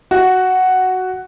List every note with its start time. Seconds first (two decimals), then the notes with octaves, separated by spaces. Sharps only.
0.11 F#4